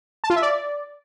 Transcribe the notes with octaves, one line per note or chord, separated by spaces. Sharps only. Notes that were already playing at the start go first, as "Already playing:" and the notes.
A5
F4
E5
D5